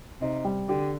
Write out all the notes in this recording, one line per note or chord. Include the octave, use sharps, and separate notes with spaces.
C3 D#4
G3
D3 G4